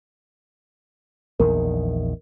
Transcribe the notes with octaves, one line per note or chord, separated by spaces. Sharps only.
A#1 E2 D#3 A#4